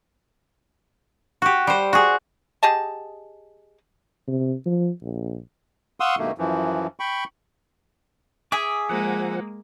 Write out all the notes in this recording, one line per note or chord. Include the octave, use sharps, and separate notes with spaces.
F#4 G4
G3 C5
F#4 G#4
G4 G#4 D#5 A5
C3
F3
A#1
F5 F#5 C6 C#6 D#6 E6
G2 B2 D#3 A3 A#3
F#2 E3 F3
G5 B5 C#6
G#4 E5 D6 D#6
F3 G#3 A#3 F#5